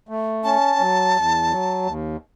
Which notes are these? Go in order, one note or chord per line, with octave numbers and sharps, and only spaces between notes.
A3
C#4 A5
F#3
E2
F#3
D#2